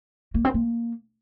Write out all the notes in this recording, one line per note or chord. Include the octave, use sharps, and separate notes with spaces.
A#3
C4
A#3